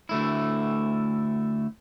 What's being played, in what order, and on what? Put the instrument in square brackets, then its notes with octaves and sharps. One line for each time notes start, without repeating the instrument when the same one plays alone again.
[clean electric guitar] D2 A3 E4